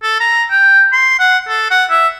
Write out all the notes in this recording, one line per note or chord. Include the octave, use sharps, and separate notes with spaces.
A4
A#5
G5
C6
F#5
A4
F#5
E5